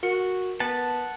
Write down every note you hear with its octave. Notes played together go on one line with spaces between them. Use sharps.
F#4 A#4 C#7
B3 F#5 A5